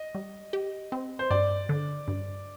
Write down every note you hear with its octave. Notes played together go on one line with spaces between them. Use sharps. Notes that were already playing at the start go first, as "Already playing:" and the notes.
Already playing: D#5
G3
G4
C4
C5
G2 D5
D3
G2